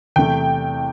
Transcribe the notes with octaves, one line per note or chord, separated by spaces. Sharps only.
E2 C3 A3 G5